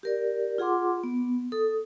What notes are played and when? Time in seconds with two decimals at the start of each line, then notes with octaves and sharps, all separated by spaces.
0.03 G4 A#4 D5
0.58 F4 G#4 F#5 C6 D6
1.04 B3
1.52 A4 D#6